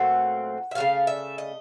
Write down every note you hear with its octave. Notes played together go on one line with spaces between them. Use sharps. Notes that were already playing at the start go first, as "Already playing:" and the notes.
Already playing: A#2 F#3 A3 C4 F#5
E5
C#3 F#3 A3 F5
E5
D#5